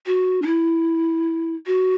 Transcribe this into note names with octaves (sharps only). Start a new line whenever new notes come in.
F#4
D4
E4
F#4